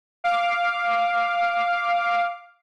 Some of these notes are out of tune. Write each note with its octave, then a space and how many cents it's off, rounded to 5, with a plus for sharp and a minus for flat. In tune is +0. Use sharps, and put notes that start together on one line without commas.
F5 +0 D6 +0